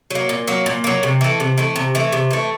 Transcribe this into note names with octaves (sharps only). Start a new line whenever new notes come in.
F#3 A#3
A#2
F#3 A#3
A#2
F#3 A#3
C3
E3 A3
C3
E3 A3
C3
E3 A3
C3
E3 A3